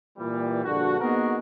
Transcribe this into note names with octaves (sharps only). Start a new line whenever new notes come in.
A#2 E3 G3
A#1 G2 D3 F#4
A#3 B3 D#4 F#4 G#4 A#4